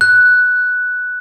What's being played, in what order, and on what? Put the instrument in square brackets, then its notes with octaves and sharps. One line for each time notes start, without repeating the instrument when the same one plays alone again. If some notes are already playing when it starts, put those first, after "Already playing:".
[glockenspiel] F#6